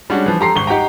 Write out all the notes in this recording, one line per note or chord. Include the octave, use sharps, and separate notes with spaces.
G3 G#3 C#4 D4 F#4
E3 F3
G4 A4 A#5 C6 C7
G#1 C#6 G7
D#4 G4 F#5 G5 A#5